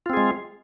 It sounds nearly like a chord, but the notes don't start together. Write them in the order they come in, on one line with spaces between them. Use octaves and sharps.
F4 C4 G#4 G#3